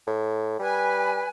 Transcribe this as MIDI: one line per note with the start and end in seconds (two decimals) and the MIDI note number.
0.07 0.59 45
0.59 1.25 55
0.59 1.27 71
0.59 1.27 80